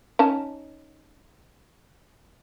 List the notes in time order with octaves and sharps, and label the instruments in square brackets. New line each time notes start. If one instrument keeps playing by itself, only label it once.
[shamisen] C#4 D#4 A5